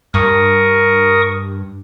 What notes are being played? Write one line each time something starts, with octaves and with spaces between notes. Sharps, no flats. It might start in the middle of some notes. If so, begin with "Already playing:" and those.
G2 A#4 C#6 D#6